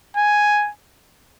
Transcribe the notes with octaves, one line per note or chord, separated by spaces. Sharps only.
G#5